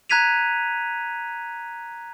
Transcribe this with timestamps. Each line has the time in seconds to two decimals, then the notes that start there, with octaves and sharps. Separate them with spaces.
0.10 A#5 F#6 G#6 B6 D#7 F7